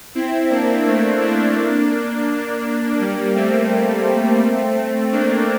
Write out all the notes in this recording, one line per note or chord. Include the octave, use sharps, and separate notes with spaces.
C4 E4
A#3 D4
A3 C4
A#3 D4
G3 A#3
A3 C4
A#3 D4